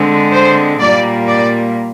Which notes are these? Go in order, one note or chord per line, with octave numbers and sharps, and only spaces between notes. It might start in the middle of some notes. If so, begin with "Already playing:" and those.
Already playing: D3 G#3 C4
C5
A#2 G3 A#3 D5
D5